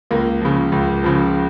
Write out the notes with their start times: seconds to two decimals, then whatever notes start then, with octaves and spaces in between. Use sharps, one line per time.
0.11 C#2 A#3
0.41 C#3 F3
0.72 C#2
1.04 C#3 F3